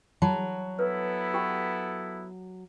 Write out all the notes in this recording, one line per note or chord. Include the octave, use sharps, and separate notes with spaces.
F#3 A5 B5
B3 E4 A4 B4
G4 G5 B5